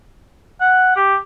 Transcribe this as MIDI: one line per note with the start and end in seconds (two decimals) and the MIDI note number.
0.61 0.92 78
0.96 1.16 67